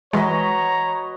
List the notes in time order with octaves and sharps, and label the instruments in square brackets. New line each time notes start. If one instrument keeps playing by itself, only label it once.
[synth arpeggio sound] E3 G#3 [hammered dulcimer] F#4 B4 D#5 [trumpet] C#5 [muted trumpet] A#5